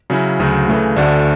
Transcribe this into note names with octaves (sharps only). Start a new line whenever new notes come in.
C#3 F#3 C#4 E4
D2 C#3 F#3
C#3 E3 A3
D2 D3 A3 D4 F#4